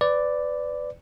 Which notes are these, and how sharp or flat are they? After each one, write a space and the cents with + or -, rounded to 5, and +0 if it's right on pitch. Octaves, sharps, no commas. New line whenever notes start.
B4 +25 D5 +0